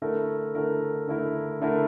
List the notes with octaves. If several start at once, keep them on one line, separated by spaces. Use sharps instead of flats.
D3 A3 E4 A#4
D3 A3 E4 A#4
D3 A3 E4 A#4
D3 A3 E4 A#4